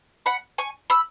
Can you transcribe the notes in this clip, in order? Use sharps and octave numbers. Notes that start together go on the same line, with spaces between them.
F#5 B5
G#5 C#6
B5 E6